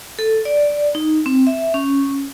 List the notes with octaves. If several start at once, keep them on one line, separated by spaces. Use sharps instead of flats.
A4
D5
D#4
C4
E5
C#4